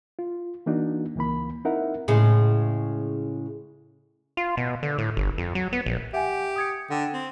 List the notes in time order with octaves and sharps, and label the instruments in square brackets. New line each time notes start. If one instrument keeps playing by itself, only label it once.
[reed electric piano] F4
E3 A#3 D4 D#4 F#4
C#2 E3 A#3 B5
C4 D#4 E4 A#4 E5 F#5
[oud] A2 C#3 G#3
[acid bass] F4
B2
D3
A2
G1
F2
F#3
B3
A#1
[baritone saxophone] G4 [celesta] E5 F#5 G#5
[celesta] D#6 G#6 C#7
[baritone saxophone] D3 [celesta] F#5 G5
[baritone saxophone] C4